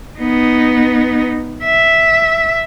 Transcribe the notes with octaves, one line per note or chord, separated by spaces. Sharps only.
B3 D#4
E5